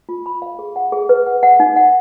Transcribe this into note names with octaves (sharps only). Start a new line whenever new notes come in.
F4
B5
F5
G#4
F#5
G#4
B4
F#5
F#5
D#4
F#5